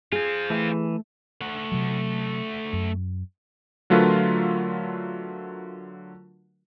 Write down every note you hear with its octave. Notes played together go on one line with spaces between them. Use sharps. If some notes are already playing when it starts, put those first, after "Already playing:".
C4 F4 G#4
E3 A3
A3 F#5
C3 F#3
F#2
D3 F#3 A3 F4 A#4 B4